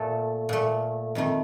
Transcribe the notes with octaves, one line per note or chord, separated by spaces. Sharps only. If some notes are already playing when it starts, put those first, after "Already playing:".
Already playing: A#2 A3 A4
A#2 A3
F2 D#3 A3